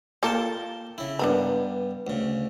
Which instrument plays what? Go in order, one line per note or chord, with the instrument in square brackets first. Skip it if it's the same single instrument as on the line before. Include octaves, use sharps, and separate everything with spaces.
[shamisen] A#3 F4 A4 [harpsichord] A#4 G5 A5
[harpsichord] C#3 E4
[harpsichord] G2 B3 [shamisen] D4 A#4 B5
[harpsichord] D2 C#3